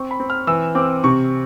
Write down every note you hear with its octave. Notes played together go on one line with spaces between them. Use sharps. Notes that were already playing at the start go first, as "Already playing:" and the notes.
Already playing: C4 C#6
B5
C4
F6
E3 E6
C4 D6
C3 C#6